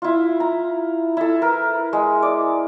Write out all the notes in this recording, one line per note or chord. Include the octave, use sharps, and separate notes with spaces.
E4 F4
A#5
E4 A4
A#4 B4
G#3
D5